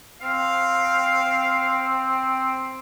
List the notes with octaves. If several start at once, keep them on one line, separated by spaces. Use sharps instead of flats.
C4 F5